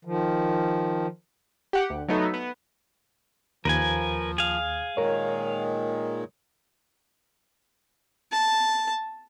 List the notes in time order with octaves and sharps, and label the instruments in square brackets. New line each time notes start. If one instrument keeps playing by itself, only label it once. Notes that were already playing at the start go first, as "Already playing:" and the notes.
[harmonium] D#3 F3
[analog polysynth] G4 F#5
D2
F#3 A3 B3 D#4 A4
B3
[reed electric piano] D#2 [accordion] F3 [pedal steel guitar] A#4 B4 G#5
[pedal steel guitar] G#4 F5
[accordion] A#2 D#3 G#3 [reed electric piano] A#4 C#5
[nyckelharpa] A5